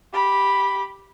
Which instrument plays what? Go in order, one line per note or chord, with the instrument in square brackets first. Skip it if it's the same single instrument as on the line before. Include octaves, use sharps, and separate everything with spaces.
[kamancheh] G4 B5